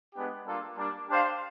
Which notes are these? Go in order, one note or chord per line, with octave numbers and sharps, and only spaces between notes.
G#3 B3 D4 G4
G3 A#3 D4 F4 A4
G3 A#3 D4
D4 G4 C5 F5